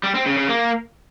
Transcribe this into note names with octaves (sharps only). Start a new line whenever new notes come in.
G3
C4
C#3
C#3
A#3